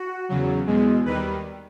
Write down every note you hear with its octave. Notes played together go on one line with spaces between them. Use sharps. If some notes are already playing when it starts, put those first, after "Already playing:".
Already playing: F#4
E2 C#3 F#3
E2 B2 G#3
D#2 D#3 G3 B4